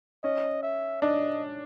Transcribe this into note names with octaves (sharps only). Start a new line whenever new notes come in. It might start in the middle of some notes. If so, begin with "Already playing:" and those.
C#4 D#5
E5
D4 D#5